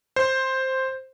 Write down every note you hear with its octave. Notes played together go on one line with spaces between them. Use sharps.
C5